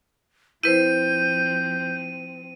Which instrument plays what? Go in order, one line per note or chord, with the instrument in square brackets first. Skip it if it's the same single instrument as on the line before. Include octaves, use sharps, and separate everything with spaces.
[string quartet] F3 C4 [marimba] E4 B4 C5 [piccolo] G6 [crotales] D#7